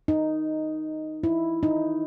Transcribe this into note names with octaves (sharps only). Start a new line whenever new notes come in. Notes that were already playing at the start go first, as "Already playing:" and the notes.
D#4
E4
D#4